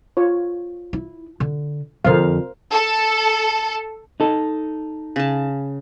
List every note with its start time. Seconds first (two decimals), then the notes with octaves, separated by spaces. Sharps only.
0.17 F4 C#5
0.93 E4
1.40 D3
2.05 F2 D3 A#4 C5 F5
2.71 A4
4.20 D#4 A4
5.16 C#3 A5